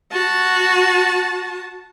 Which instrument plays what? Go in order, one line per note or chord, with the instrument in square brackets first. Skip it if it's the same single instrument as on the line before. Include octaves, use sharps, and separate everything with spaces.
[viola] F#4 A5